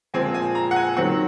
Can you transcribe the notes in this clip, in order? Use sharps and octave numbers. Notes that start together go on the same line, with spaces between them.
A#2 F3 G#3 C4 G#5
G#5
A#5
F#5
G#5
D#3 F#3 C4 F#5